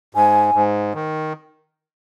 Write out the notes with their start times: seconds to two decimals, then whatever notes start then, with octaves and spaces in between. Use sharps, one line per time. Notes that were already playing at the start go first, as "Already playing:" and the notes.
0.15 G#2 G#5
0.54 G#2
0.94 D#3